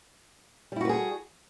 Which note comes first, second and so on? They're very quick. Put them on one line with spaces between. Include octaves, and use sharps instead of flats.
G3 E4 F#4 B4 G#4